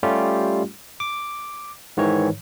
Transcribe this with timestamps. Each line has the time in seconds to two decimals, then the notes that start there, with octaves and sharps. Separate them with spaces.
0.03 G3 A3 C#4 F4 G4
1.00 D6
1.97 G#2 D#3 E3 C#5